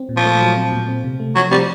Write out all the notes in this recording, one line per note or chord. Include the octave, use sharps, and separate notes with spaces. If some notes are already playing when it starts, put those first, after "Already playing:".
Already playing: C4
A#2
F3
A3
F#3
C4
A#2
C4
C3
A3
F3 F#3
G3 C4